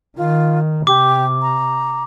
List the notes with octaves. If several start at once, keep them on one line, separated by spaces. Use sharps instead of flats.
D#3 F4
C3 G4 D6
A#5